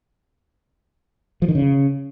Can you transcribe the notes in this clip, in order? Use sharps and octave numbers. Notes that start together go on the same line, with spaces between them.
F3
D#3
C#3